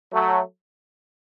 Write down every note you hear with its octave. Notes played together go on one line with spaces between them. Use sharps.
F#3 A3